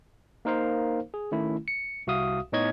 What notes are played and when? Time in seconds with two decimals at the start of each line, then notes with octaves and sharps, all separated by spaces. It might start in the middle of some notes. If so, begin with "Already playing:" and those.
0.45 A#3 D#4 A#4 C5 F5
1.14 G#4
1.32 D#3 A3 C#4 E4
1.68 C#7
2.07 C2 F#4 E5 F5 D#6
2.52 A2 B3 D#4 C#5 D#5 G#6